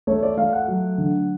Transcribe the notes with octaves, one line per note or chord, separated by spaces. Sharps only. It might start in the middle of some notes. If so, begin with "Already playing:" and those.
A3 C#5
D5
A3 F5
F#5
F#3
D3